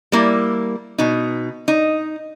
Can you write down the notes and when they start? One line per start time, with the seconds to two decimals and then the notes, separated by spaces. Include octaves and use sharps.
0.12 G3 A#3 E4
0.98 B2 D#4
1.68 D#4